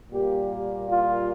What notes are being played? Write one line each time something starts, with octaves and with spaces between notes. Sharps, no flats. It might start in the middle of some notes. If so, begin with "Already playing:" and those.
A#2 G3 A#3 G4
F4